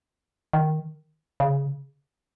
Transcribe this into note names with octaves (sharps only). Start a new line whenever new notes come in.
D#3
C#3